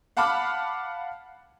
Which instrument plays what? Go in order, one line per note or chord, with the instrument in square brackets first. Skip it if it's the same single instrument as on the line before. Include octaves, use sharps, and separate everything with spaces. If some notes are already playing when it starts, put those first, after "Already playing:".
[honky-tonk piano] F5 F#5 A5 B5 D6 F6